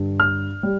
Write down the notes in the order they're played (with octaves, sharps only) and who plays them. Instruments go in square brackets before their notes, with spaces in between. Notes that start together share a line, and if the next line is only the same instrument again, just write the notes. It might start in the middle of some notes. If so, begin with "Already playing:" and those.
Already playing: [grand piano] G2 D3 G3
F6
G3